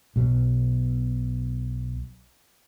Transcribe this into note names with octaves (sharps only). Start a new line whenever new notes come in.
B1 B2 F#3